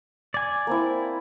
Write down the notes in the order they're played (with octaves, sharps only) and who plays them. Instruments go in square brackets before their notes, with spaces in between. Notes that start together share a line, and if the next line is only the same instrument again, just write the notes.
[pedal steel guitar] D5 G#5
[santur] A#3 C4 E4